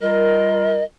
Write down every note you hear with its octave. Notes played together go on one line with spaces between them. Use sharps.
G3 F4 A#4 D#5